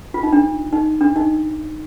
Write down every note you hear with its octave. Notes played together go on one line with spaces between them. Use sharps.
F4
D#4
D4
D#4
D4
D#4